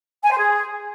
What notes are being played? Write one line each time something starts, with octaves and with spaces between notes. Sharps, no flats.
G#5
C5
G#4